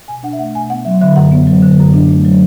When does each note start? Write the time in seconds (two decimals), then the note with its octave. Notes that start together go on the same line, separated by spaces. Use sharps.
0.08 B2 G#5
0.23 D4 F#5
0.33 E5
0.39 A3 F#5
0.55 B2 G#5
0.70 B3 F#5
0.85 F#3 E5
1.01 D3 E5
1.16 F#2 F#5
1.32 B3
1.47 F#3
1.63 D3
1.79 F#2
1.94 D4
2.09 A3
2.25 F#3